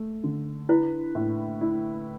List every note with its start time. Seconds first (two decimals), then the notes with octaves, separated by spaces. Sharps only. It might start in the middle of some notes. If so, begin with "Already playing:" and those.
Already playing: A3
0.24 D3
0.69 E4 B4
1.15 A2
1.61 E4